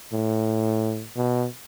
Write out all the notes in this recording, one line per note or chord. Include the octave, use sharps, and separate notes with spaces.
A2
B2